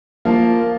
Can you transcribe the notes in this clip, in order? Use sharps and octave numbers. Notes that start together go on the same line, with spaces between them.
F3 A#3 F4